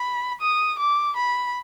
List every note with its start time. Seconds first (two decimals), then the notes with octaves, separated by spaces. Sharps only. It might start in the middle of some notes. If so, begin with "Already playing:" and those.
Already playing: B5
0.41 D#6
0.79 D6
1.17 B5